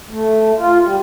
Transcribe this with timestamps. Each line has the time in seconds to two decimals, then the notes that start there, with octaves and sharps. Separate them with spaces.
0.11 A3
0.58 F4
0.83 G3